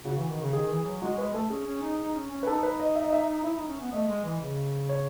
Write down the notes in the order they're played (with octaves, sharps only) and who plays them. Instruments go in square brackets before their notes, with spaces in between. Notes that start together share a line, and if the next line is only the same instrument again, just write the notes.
[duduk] C#3 [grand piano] F#4
[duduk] E3
D#3
C#3
[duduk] D#3 [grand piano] G#4
[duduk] E3
F#3
[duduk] G#3 [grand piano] F#4
[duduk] G#3 [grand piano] B4
[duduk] A3 [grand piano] A4
[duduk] C#4 [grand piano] G#4
[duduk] C#4
D#4
D#4
C#4
C#4
[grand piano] B4
[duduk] D#4 [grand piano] A4
[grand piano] B4
D#5
E5
D#5
E5
[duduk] E4 [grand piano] E5
[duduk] D#4
C#4
B3
[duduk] A3 [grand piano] D#5
[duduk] G#3
E3
C#3
[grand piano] C#5